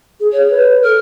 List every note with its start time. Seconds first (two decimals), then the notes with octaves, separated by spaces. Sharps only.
0.20 G#4
0.32 C#5
0.51 B4
0.84 A4 F6